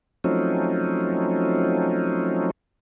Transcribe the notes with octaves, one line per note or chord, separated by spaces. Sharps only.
F3 F#3 A3 C4 C#4 D#4